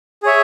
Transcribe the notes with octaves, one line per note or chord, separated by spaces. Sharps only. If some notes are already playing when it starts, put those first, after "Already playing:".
G#4 C#5 E5